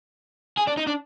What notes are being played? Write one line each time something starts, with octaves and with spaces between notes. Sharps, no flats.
G#4
D4
D#4
D4